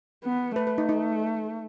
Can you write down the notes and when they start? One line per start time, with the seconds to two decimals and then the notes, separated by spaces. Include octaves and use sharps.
0.24 B3
0.56 A3 B4
0.67 B4
0.78 D#4
0.89 D#4